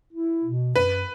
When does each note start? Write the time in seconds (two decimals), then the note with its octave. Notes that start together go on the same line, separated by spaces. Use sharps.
0.12 E4
0.44 B2
0.76 F#2 B4